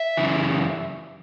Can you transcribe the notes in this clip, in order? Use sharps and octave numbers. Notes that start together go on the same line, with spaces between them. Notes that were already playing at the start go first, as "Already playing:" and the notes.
Already playing: E5
F#2 C#3 E3